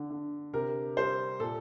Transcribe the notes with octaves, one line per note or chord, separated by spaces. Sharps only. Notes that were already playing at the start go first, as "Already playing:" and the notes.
Already playing: D3
D3
C3 A#4
G3 C5
A#2 A4